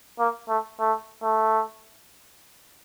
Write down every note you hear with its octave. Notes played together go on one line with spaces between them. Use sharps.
A#3
A3
A3
A3